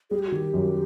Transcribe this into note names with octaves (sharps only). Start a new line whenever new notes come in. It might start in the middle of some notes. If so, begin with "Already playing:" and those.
G3 G#4
G4
F#4
D#3 G4
F#2